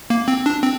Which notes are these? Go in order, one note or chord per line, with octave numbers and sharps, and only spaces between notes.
A#3
C4
D4
C4